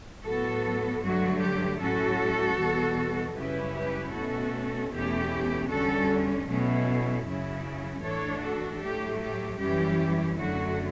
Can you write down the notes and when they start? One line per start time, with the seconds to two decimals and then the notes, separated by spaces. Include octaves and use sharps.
0.24 A2 F#3 B3 F#4 A4
1.02 G2 D3 F#3 A3 F#4
1.40 G4
1.80 A2 F#3 C#4 F#4 A4
2.58 E2 B2 G3
3.36 F#2 C#3 G3 C#4 E4 G4 B4
3.75 G4 B4
4.13 B2 A3 C#4 F#4 A4
4.92 E2 B2 A3 C#4 E4 G4
5.69 E2 D3 G3 C#4 F#4 A4
6.48 B2 F#3 A3 C#4 E4
7.25 F#2 C#3 F#3 C#4 E4
8.03 A2 E3 A3 D4 A4 C#5
8.42 F#4 A4
8.81 A2 F#3 A3 G4
9.20 G4
9.59 F#2 E3 G3 C#4 E4 G4
10.37 F#2 D3 F#3 A3 F#4